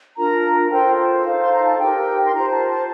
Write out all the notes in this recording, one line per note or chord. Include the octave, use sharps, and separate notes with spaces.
D4 F4 A#4 A#5
F4 A4 C5 G5
D#4 A4 C5 F5
C6
A#5
A5
D#4 G4 A#4 G5
C6
F4 C5 A#5
A5
A5